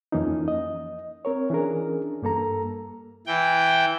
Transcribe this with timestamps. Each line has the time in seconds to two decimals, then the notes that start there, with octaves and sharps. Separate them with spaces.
0.12 F2 E3 F3 A#3 C#4 D#4
0.48 D#5
1.25 C4 A#4 C#5
1.50 E3 C#4 D4 G#4 A#4
2.22 G2 A#3 A4 A#5
3.27 E3 G5